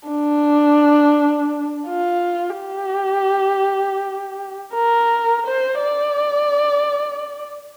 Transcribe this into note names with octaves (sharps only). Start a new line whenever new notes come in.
D4
F4
G4
A#4
C5
D5